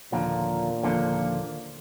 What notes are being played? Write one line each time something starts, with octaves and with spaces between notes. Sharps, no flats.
D#2 A#2 D3 F3 A#3
D#2 D3 F3 A#3